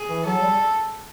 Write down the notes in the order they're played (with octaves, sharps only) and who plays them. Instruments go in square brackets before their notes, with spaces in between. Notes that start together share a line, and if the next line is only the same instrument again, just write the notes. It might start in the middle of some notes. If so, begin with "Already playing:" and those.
Already playing: [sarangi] G#4
[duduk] E3
[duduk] F#3 [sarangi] A4
[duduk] G3